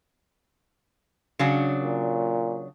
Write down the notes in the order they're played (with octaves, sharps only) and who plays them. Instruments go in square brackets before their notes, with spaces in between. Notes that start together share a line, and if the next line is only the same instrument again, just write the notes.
[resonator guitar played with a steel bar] C#3 F#3 D4
[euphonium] A#2